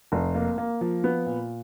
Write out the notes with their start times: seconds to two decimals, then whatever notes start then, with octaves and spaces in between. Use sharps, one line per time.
0.12 F1
0.35 A#3
0.58 A#3
0.81 F3
1.04 B3
1.26 A#2